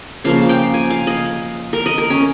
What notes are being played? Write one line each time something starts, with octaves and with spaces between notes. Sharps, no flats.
C#3 F3 A#3 F5
F5
G5
G#5
F5
D#5
A#4
D#5
A#4
C#4